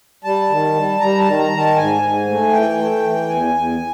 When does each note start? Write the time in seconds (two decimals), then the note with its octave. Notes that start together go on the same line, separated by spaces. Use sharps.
0.24 G3 A5
0.50 D#3
0.75 G3
1.00 G3 A#5
1.19 A5
1.25 D#3
1.38 A#5
1.51 D#3
1.57 A5
1.76 G#2 G#5
2.02 G#2
2.27 A3
2.52 E3 G5
2.78 A3
3.03 E3
3.29 E2 G#5
3.54 E2